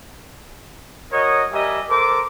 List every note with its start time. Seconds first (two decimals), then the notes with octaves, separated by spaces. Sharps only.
1.12 F#4 A#4 C#5 D#5
1.53 G3 G4 A#4 D#5 E5 G#5
1.89 A4 A#4 C5 D6